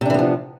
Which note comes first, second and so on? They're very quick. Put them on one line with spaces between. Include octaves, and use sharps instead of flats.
C3 D4 E3 B3 F3